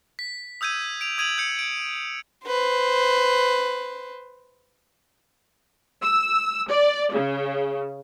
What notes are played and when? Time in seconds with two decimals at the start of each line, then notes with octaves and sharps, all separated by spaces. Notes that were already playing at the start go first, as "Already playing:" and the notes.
0.19 B6
0.61 D#6 E6 G6 G#6 D#7
1.01 D7 F7
1.18 D#6 G#6 D#7 F7 F#7
1.38 G6 C#7
1.59 D7
2.46 B4 C5
6.03 E6
6.70 D5
7.14 C#3